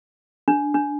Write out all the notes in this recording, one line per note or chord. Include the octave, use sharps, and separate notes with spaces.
D4
D4